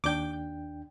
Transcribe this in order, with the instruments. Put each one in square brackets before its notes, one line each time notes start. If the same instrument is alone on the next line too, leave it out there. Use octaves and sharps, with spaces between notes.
[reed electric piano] D#2 D4 G5 [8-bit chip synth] D6 G6